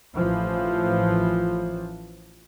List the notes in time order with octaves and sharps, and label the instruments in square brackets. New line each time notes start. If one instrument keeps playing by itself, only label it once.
[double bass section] A1 E3 F3